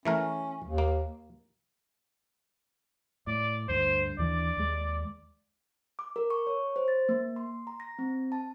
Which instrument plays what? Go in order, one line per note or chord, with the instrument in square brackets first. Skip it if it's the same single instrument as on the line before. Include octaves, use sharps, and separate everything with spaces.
[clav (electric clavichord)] E3 A3 A#4 [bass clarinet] C#4
[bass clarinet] D#2
[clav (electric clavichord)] A#3
[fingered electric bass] A2 [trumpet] D5
[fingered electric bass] D2 G2 D3 [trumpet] C5
[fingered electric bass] D#2 E3 D4 [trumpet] D5
[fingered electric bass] D#2 G#3
[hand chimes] D6
A#4
C#6
C#5
C5
A6
A#3
C6
A#5
A#6
C4
A5